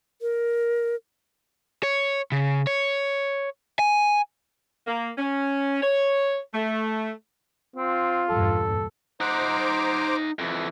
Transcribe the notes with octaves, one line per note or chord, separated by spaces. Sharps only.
A#4
C#5
C#3
C#5
G#5
A#3
C#4
C#5
A3
C4 F4
E2 G2 A#2 A4
D#4 C5 F#5 A#5 D6
F2 E3